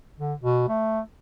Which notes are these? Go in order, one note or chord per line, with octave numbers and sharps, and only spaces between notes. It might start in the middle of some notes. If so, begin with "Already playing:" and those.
D3
B2
A3